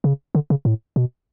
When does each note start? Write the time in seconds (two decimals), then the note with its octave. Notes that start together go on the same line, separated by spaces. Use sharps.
0.04 C#3
0.35 D3
0.50 C#3
0.65 A2
0.96 B2